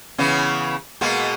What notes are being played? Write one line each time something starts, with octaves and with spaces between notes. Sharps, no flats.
C#3 E3 B3
B2 G#3 A#3